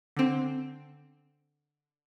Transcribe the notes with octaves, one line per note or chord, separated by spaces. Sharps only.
D3 C4